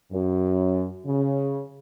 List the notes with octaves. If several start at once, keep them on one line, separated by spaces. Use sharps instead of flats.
F#2
C#3